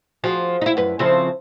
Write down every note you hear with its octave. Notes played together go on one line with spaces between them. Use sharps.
F3 F#4 G#4
D#4 E4
F#2 B4
C#3 F3 C4 E4 A4 C5